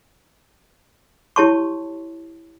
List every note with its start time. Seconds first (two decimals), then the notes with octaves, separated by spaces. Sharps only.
1.36 E4 G4 C#5 A5 C6 C#6